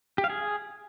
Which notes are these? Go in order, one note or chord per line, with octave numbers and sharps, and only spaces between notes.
G4
F5
G#4